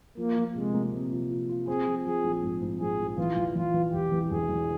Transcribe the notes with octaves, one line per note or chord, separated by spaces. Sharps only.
F3 A#3
F3
C3 G#3
A#3
C3
F3
F4
F4
C4 G#4
F3
F3 G#4
A#1
G#2
G#2
A#1 G#4
A#1
E3 F4
E2
E2 F4
E3
E1 G4
E3
E1 G#4
E2